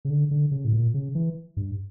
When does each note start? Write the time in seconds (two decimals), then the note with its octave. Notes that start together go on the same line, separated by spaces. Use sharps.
0.05 C#3
0.10 D3
0.31 D3
0.51 C#3
0.65 A2
0.73 A#2
0.94 C#3
1.15 E3
1.57 G2